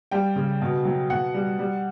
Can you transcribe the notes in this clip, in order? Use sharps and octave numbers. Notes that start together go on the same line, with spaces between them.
G3 G5
C#3
B2
F#3
B2 F#5
G3
G3